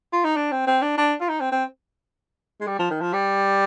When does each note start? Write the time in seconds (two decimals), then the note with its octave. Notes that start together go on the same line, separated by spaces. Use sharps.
0.13 F4
0.25 D#4
0.36 D4
0.51 C4
0.67 C4
0.82 D4
0.98 D4
1.21 F4
1.29 D#4
1.40 C4
1.52 C4
2.60 G#3
2.67 G3
2.79 F3
2.90 D#3
3.01 F3
3.13 G3